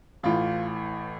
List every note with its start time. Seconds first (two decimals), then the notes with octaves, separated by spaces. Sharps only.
0.23 A1 A2 E3 F4